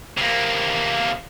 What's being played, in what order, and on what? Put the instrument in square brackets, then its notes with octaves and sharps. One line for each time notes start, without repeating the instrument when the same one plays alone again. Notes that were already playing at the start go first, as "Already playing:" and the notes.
[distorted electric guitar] C3 A#3